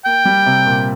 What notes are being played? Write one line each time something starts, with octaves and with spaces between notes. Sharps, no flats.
A#3 G5
G3
C3
A#2